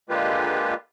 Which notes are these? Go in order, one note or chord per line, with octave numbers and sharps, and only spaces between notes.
D3 G#3 A#3 F4 G4 B4